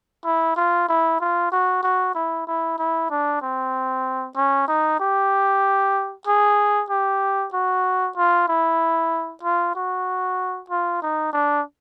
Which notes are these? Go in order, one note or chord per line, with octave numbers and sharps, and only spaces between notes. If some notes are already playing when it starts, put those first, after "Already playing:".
E4
F4
E4
F4
F#4
F#4
E4
E4
E4
D4
C4
C#4
D#4
G4
G#4
G4
F#4
F4
E4
F4
F#4
F4
D#4
D4